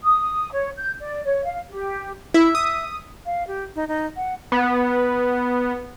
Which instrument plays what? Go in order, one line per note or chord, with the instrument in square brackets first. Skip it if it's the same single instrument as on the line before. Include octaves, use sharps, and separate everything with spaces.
[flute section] D#6
C#5
G6
D5
C#5
F5
G4
[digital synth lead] E4 [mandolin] E5
[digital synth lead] D#6
[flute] F5
G4
D#4
D#4
F#5
[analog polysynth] B3